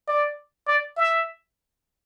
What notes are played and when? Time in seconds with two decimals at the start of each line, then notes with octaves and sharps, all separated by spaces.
0.08 D5
0.67 D5
0.97 E5